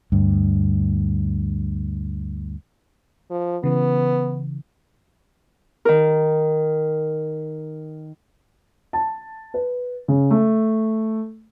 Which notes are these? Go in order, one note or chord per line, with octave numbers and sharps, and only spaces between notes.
D2 G2
F3
C#3 E3 B3
D#3 A#4
A5
B4
C#3
A3